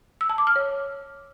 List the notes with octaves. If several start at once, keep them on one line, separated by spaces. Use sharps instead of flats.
E6
A5
D6
F6
C#5